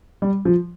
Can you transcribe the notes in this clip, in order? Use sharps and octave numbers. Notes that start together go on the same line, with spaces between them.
G3
F3